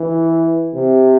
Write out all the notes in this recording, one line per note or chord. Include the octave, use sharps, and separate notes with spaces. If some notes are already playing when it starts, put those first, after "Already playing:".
Already playing: E3
C3